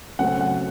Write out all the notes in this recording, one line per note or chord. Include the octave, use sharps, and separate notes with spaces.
C#3 F#3 A3 C4 F#5
F#5